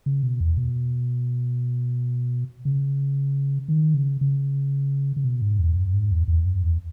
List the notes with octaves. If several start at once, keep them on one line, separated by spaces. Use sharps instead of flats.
C#3
B2
E2
B2
C#3
D#3
C#3
C#3
C#3
B2
G#2
E2
F#2
G#2
E2
E2
F#2
E2